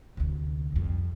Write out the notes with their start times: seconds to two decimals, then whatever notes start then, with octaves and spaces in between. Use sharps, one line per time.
0.17 D2 C3
0.72 C2 F2